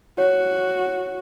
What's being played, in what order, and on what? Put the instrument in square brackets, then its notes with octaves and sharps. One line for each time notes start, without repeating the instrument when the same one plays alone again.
[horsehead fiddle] F#4 [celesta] C#5